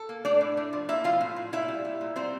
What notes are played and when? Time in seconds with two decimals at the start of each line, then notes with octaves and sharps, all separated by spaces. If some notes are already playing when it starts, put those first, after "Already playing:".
Already playing: A4
0.09 A#3
0.25 A3 D4 D5
0.41 A2
0.57 A3
0.73 F3
0.89 A#3 E4 E5
1.04 F3 F4 F5
1.21 A2
1.36 A2
1.53 A#2 E4 E5
1.68 G3
1.85 G3
2.01 A#2
2.16 G3 C4 C5